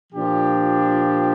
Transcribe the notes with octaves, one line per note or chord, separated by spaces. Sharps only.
A#2 F3 D4 G4